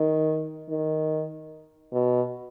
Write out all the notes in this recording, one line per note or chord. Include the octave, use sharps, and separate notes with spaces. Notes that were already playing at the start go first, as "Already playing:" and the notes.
Already playing: D#3
D#3
B2